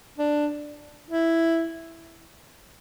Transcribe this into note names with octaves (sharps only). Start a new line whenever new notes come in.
D4
E4